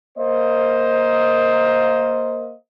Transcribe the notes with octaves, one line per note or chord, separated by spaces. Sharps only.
A#3 C5 D#5